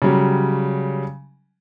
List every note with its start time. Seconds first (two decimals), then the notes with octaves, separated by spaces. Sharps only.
0.02 C#3 F#3 G3